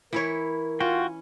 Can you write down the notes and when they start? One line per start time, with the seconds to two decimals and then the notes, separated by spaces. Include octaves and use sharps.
0.13 E3 E4 A#4 C#5
0.80 C#4 F4 F#4 G5